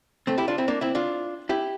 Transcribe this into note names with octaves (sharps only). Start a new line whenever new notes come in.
A3 C4
E4 G4
D4 F4
C4 E4
A#3 D4
C4 E4
D4 F4
E4 G4